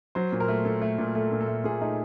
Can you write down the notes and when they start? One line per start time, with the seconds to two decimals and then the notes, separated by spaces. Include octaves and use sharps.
0.15 F#3 C5
0.32 A#2
0.40 A#4
0.48 A3
0.65 A#2 A4
0.82 A3
0.98 A#2
1.15 A3 A4
1.32 A#2
1.40 A4
1.48 A3
1.64 A#2 G#4
1.81 A3 D#4